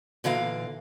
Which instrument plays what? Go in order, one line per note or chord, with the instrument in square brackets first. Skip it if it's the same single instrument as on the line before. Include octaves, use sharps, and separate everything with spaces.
[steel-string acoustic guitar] A#2 D3 E3 F5